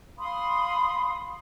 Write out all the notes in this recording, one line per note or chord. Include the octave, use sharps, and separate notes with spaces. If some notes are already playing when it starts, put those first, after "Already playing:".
F5 B5 C6 D#6